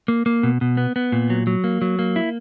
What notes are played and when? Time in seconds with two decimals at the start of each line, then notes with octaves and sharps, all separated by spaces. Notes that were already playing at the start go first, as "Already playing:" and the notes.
0.08 A#3
0.26 A#3
0.43 B2
0.61 B2
0.77 B3
0.96 B3
1.12 A#2
1.30 F#3
1.47 F#3
1.64 A#3
1.82 F#3
1.99 A#3
2.16 E4